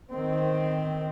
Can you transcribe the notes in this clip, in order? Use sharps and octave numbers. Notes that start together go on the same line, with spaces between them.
D#3 C4